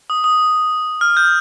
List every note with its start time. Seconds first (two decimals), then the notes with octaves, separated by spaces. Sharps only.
0.10 D#6
0.24 D#6
1.01 F6
1.17 G6